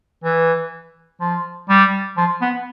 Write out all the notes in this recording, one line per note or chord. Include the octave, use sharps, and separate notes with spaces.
E3
F3
G3
F3
B3